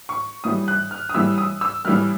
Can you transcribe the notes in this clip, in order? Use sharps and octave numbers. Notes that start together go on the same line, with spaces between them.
C#6
A2 E3 G3 D#6
F#6
F6
D#6
A2 E3 G3 E6
D#6
E6
A2 E3 G3 F6